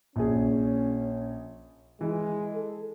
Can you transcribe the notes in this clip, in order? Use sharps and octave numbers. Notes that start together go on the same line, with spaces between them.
A#1 C#4 G#4
E3 G#3
A4